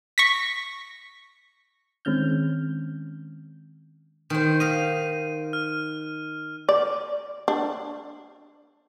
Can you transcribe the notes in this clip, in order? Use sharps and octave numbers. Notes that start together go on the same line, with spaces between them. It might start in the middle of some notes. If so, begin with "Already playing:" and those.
C#6 A#6 B6
D#3 G#3 C4 C#4 F6 G6
D#3 C5
D#5 F5 D#7
F6
D5
D4